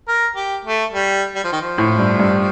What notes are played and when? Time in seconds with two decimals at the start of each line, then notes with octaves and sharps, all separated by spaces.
0.08 A#4
0.36 G4
0.65 A3
0.93 G3
1.35 G3
1.44 F3
1.52 D#3
1.61 F3
1.78 A2
1.99 G2
2.19 G2